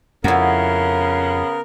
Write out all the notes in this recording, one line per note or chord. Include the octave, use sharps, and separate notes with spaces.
F2 C#3 B3 E4 F#4 A#4